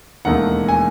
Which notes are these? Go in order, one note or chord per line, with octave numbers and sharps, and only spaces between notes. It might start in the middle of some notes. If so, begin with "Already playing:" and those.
E1 D#2 D#3 A3 F#5
G#5